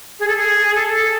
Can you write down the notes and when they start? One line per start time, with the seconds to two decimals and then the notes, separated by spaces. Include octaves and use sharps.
0.20 G#4
0.28 A4
0.37 G#4
0.75 A4